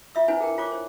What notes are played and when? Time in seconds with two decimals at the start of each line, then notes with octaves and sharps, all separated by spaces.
0.15 F4 E5 E6
0.28 D4 E4 B4 C5 F#5 G#5
0.40 G#4 A#4 G5
0.58 F4 C#5 D6
0.72 C5